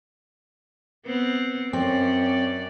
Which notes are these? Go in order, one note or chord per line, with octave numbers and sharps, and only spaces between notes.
B3 C4
F#2 C4 C#4 D5